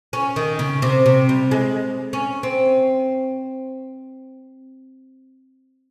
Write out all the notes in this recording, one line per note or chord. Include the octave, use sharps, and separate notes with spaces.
C#4
D#3
C#3
C3
C3
G3
G#3
C#4
C4